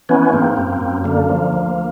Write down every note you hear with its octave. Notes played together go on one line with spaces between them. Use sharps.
E3 B3 C#4
G#2 A#3 C4
F#2
F#2
D3 A#3
F3
D2